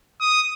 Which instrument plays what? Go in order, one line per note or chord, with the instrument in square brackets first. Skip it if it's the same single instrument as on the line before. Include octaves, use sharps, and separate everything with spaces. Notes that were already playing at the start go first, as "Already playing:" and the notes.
[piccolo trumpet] D#6